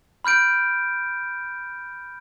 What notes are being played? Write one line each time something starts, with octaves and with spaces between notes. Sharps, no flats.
B5 F6 G6 D7